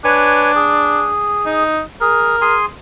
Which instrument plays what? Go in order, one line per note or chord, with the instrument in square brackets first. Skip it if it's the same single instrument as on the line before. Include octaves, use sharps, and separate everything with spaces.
[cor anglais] D4 [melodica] B4 C#5 G#5
[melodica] G#4
[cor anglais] D#4
[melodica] G#4 [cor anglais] A#4
[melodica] G#4 G#5 C6